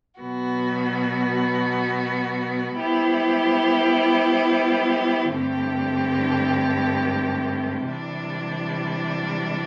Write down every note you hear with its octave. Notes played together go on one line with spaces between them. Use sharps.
B2 F#3 B3 F#4
G3 B3 E4 G4 C5
G2 D3 A3 C4 G4
C3 E3 G3 D4